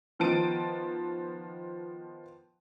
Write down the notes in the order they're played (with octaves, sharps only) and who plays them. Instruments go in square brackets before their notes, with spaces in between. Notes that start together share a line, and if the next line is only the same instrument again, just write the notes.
[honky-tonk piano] D#3 F3 B3 A5 D7 D#7